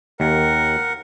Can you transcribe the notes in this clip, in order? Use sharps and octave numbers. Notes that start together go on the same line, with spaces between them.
D#2 A#4 F#5